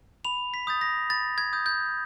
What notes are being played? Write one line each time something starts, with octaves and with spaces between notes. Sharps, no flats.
B5 F7
B6
D#6 G6 A6
A#6
B5 A6
G#6
D#6 G6
G6